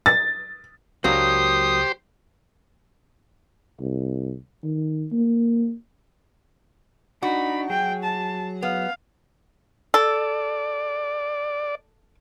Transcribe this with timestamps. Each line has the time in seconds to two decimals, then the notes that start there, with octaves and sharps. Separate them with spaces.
0.06 A6
1.04 C#2 F#3 A#3 D4 G4 C5 D#6
3.80 C2
4.63 D#3
5.12 A#3
7.23 D4 D#4 F#4 B5
7.70 F#3 G#4 G5
8.04 A5
8.62 B3 F5
9.94 A4 D5